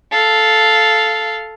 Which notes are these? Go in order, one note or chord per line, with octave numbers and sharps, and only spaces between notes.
A4 F5